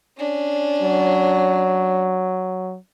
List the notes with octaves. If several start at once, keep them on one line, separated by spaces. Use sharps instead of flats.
C#4 D4
F#3